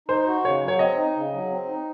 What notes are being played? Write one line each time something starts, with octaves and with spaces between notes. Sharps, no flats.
D#4 C5
F#4
C#3 C#5
F#3
C#5
C4 D#5
D#4
C#3
F#3
C4
D#4